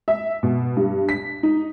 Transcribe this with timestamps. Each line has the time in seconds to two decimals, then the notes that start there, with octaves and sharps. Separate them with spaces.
0.08 E5
0.43 B2
0.76 G2
1.09 B6
1.43 D#4